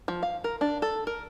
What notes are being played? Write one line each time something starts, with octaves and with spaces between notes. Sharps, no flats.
F3
F5
A#4
D4
A4
A#4